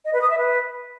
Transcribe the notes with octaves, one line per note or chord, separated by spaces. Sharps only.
D#5
B4
D#6
E5
B4